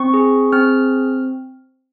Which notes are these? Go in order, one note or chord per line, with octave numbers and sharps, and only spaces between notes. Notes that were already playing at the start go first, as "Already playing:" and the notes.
Already playing: C4 C#6
G#4
C4 F6